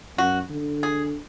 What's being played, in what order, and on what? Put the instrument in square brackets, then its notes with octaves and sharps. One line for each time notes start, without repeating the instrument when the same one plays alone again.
[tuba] F#2 [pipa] F#4
[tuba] D3
[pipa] G#4